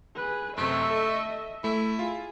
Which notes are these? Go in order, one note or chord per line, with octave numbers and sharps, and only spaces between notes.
G#4 B4
F#2 C3 A3 D#5 E5
A4
A3 E4
F4 G#4